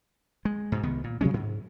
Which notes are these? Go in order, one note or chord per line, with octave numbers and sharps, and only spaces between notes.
G#3
G#2 B2
C2 D#3 B3
A#2
C3 F#3 G#3 C#4
G#2